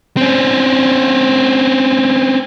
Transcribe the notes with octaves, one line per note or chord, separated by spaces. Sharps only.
C4 C#4